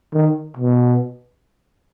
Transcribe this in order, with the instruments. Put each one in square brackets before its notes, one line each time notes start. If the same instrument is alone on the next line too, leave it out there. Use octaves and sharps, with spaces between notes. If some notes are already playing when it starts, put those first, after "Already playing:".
[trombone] D#3
B2